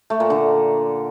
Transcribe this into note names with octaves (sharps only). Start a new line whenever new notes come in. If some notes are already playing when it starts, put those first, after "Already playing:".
A3
A#2
D3